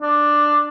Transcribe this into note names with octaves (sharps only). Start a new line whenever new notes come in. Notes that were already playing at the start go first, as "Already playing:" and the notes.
D4